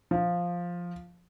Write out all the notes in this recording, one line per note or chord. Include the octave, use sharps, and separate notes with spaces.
F3